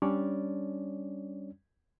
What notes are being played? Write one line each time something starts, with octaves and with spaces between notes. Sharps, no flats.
G3 C#4 D4 C#5 D5